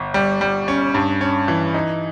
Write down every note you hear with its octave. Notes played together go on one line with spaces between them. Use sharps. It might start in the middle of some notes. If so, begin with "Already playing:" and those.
Already playing: G1
G3
G3
C#4
G2
C#4
E3
D#4